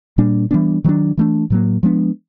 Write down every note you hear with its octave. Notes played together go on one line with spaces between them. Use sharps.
A#2 G3 A#3 D4
E3 G3 B3 D4
D#3 F#3 A#3 D4
E3 A3 D4
A2 F#3 A#3
F3 G#3 B3 D4